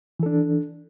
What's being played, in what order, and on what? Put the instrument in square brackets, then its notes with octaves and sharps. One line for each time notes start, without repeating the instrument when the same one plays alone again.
[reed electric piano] E3
A4
D4